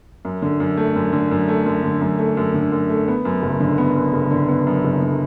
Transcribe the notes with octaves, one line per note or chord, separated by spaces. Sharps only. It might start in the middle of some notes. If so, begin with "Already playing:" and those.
F#2
D3
F#2
A3
F#2
D3
F#2
A3
F#2
D3
F#2
A3
F#2
D3
F#2
A3
B3
F#2
F#1
D3
B3
F#2
F#1
D3
B3
F#2
F#1
D3